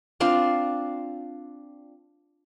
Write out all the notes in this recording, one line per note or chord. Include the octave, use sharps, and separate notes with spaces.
C4 D4 F4 F5